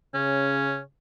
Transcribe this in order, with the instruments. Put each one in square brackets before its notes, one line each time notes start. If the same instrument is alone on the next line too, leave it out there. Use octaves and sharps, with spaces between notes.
[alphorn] C#3 [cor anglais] C#4